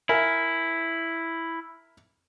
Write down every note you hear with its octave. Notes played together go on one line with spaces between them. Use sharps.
E4 A#4 E5 G#5